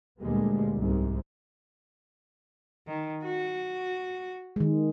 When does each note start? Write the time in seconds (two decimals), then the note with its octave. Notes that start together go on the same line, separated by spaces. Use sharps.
0.20 D2 A#2 G3 G#3 A#3 B3
0.75 C2 G#2 C3
2.87 D#3
3.25 F#4
4.56 D#3 G#3